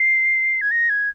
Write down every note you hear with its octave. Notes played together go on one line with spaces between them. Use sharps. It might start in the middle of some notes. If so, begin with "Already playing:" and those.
Already playing: C7
G#6
A#6
G#6